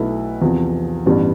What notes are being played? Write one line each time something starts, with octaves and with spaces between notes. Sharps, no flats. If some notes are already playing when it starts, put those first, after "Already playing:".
Already playing: B1 B2 A3 E4 B4
E2 C3 F3
A1 G2 E3 G3 B3